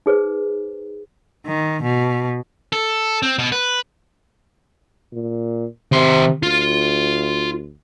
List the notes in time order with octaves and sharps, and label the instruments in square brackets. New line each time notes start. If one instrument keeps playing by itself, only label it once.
[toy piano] D#4 G#4 B4 C5
[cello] D#3
B2
[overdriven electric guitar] A4
C4
B2
B4
[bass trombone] A#2
[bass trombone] C3 [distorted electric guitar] D#3 C6
[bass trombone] D2 [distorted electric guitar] F4